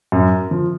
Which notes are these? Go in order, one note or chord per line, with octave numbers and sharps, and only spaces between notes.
F#2
F3